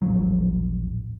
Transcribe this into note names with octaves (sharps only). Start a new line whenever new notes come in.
D#1 A1 F3 F#3